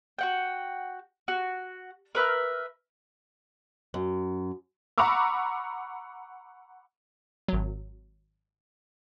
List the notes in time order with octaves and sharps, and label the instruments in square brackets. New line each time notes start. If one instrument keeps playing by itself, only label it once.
[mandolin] F#4 F#5 G5
F#4
A#4 B4 E5 F6
[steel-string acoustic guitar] F#2
[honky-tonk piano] F#5 A#5 B5 C#6 D6 E6
[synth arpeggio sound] G#1 F#3